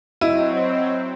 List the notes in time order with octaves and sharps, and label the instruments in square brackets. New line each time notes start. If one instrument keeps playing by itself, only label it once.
[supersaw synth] F#3 C4 [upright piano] E4 [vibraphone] D#5